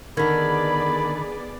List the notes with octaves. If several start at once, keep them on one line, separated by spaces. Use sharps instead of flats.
D3 D#3 B3 G#4 A#4 D5 B5 G#6